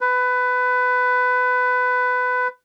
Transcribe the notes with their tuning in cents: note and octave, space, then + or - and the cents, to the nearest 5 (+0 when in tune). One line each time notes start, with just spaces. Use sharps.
B4 +20